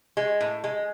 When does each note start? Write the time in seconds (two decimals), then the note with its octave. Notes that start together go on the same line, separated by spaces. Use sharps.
0.17 G#3
0.41 A2
0.64 G#3